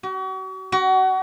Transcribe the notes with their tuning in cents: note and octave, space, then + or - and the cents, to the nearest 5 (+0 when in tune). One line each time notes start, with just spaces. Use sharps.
F#4 +40
F#4 +25